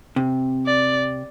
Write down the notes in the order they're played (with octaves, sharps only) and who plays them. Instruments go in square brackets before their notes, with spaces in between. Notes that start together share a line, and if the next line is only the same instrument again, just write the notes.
[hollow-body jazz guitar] C3
[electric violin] D5